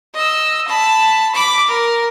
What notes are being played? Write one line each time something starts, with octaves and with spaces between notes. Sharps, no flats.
D#5 E6
A5 B5
B5 D6
A#4